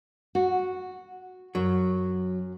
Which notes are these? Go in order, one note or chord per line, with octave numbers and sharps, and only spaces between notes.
F#4
F#2 F#3